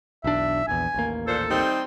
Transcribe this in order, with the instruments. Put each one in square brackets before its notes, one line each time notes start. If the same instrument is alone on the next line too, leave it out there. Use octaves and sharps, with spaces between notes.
[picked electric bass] B1 E2 D4 [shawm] E5
[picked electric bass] A#1 E2 [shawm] G#5
[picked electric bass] A1 D#2 A#3
[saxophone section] A#2 C5 [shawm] A4
[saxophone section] G3 C4 D#4